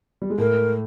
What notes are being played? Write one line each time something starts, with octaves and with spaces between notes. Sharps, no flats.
G3
G#3
A2 A3 A#4